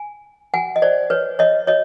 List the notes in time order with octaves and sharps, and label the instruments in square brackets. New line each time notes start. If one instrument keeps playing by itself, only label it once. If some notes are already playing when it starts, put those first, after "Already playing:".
Already playing: [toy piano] G#5
F#5 G#5
D#5
C5 D5
B4 C#5
C#5 D#5
C#5 D#5